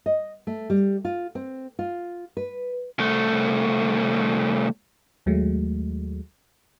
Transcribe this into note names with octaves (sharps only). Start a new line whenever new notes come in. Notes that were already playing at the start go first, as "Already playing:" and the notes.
D#5
A3
G3
F4
C4
F4
B4
C2 A3
D#2 F#3 G#3 A3